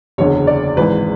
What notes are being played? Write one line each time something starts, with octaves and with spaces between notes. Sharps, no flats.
F#1 E2 D3 C#5
D5
G#1 G#2 E3 B4